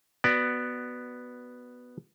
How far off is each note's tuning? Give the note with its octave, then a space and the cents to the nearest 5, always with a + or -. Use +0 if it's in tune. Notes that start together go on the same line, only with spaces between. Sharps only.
B3 +0 F#4 +10 D5 +10